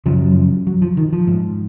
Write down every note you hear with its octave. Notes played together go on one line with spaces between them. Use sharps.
F#2 C#3 F3
F#3
F3
F#3
F3
D#3
F3
G#2